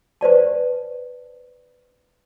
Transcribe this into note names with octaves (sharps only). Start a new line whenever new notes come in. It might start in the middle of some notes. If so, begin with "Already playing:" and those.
B4 C5 D5 A5